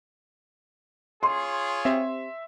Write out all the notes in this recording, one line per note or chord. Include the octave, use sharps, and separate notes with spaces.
F4 G#4 C#5 C6
C4 G4 C5 E5